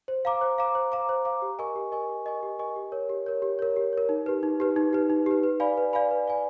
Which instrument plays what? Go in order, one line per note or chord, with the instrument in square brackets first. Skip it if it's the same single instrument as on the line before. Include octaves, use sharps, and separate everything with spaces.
[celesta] C5
F5 A#5 D6
C5
F5 A#5 D6
C5
F5 A#5 D6
C5
F5 A#5 D6
G4
A#4 D#5 G#5 C#6
G4
A#4 D#5 G#5 C#6
G4
A#4 D#5 G#5 C#6
G4
A#4 D#5 G#5 C#6
G4
A#4 C#5
G4
A#4 C#5
G4
A#4 C#5
G4
A#4 C#5
D#4
G4 B4
D#4
G4 B4
D#4
G4 B4
D#4
G4 B4
B4
D5 F5 G#5 B5
B4
D5 F5 G#5 B5
B4
D5 F5 G#5 B5